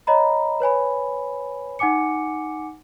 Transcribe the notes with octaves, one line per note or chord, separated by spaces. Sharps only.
C#5 D#5 A#5 B5
B4 C#5 G#5 B5
D#4 F#5 G#5 D6 C#7